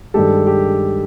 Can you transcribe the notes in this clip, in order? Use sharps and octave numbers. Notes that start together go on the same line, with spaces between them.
G2 D#3 G#3 G4 A4
G4